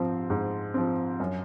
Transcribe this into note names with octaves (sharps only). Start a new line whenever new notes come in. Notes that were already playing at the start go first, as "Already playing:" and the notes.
Already playing: G#2 F3 C4
G#2
F3 C4
F#2